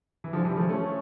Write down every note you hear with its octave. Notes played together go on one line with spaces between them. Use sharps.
E3
D3 F3
E3 G3
F3 A3
A3 C#4